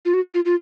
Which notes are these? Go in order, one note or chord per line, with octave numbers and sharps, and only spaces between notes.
F4
F#4
F4
F4